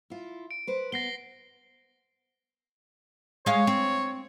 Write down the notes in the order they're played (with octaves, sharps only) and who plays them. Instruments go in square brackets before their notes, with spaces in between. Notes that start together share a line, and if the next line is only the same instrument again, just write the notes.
[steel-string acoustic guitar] E4 F4
[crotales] D7
[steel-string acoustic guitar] B4 C5
[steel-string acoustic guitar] B3 [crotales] A#6 C7 G7
[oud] G#3 F5 [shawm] C#5
[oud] C4